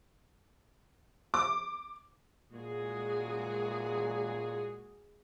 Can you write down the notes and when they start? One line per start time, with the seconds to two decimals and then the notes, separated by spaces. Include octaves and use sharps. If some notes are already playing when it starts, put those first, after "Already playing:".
1.34 D6
2.52 A#2 G#3 F#4 G#4